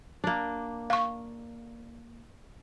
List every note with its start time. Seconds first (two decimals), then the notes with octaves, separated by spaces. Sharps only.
0.24 A#3 D4
0.90 F5 C#6